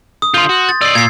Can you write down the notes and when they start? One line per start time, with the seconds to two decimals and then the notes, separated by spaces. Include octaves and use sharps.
0.22 D#6
0.34 D3 F4 C6 G6
0.49 F#4
0.69 A6
0.81 D5 D#5 E6 C7
0.95 A#2 G#6 C7